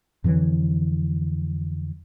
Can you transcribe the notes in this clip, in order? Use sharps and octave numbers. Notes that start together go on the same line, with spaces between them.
F2 D3 E3 F#3